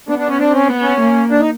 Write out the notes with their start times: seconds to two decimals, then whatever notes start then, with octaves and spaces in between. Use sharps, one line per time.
0.09 B3 D4
0.19 D4
0.29 C#4
0.39 C4 D4
0.54 C#4
0.69 B3
0.82 C#4
1.00 A#3
1.31 D4
1.40 D#4